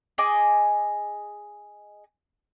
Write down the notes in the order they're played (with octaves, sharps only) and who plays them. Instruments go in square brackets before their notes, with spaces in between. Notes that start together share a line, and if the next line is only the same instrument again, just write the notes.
[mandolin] G#4 D#5 G#5 D6